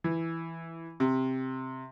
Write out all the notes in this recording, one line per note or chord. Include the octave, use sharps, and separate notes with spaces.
E3
C3